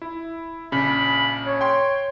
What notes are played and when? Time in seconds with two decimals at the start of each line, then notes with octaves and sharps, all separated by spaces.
0.02 E4
0.72 A#1 C#3 B5
1.46 C#5
1.61 G5 C6